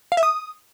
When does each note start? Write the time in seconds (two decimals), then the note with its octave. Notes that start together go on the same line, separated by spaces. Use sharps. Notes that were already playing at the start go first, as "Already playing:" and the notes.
0.12 F5
0.17 E5
0.23 D#6